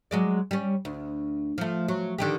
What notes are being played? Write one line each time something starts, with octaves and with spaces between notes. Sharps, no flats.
F#3 G#3 D5
G3 C#4
D2
F3 A3
F#3
D3 D#3 G4